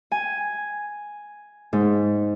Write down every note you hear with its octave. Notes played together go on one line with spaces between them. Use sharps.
G#5
G#2